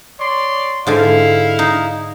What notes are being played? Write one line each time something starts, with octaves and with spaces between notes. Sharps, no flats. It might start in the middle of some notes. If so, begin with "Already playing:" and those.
C#5 D5 C6
G#2 D3 E4 F5 G#5
D#4